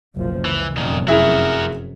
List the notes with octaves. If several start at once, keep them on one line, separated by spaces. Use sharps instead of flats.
F#1 B1 F3
C#2 E3
F1 F#2 A#2 D#3
E4 F#4 G#4 A#4 E5